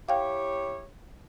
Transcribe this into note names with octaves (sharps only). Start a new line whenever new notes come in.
E4 G4 C#5 F5 G5